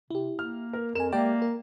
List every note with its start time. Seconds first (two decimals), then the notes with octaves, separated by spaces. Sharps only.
0.10 C3 E4 G4
0.39 A#3 F6
0.73 A#4
0.95 F2 A#4 G#5 E7
1.12 G#3 A#3 G4 D5 E5 G5
1.42 A#4